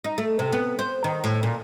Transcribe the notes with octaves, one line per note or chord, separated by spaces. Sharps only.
D#4
A3
C3
B3
C5
D#3
A2
A#2